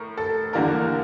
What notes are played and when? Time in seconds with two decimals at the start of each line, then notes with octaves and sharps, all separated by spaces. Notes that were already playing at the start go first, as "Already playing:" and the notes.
Already playing: A2 A#4
0.18 A4
0.53 E2 D3 G3 A#3 A#4